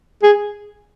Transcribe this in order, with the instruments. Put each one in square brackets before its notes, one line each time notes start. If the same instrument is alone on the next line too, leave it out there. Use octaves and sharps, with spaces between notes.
[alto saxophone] G#4